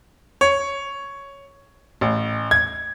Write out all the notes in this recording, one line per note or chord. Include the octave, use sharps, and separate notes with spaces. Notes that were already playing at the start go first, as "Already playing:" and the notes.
C#5
A1
G#6